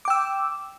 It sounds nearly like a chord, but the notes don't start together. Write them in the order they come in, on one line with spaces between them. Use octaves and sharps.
D6 G5 E6